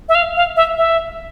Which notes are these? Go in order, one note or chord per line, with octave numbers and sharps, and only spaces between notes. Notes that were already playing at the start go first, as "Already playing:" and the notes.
E5
F5
F5
E5
E5